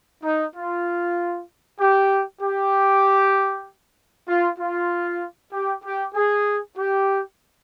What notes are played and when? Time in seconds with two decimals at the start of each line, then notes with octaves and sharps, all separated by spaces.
0.23 D#4
0.55 F4
1.79 G4
2.41 G4
4.28 F4
4.59 F4
5.52 G4
5.84 G4
6.15 G#4
6.77 G4